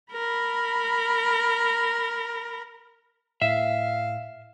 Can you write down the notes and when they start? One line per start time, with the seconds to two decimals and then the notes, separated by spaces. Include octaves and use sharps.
0.12 A#4 B5
3.42 A2 E5 F5